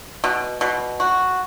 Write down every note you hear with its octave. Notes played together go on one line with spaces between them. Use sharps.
B2
B2
F#4